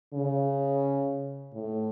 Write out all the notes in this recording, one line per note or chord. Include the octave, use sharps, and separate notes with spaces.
C#3
A2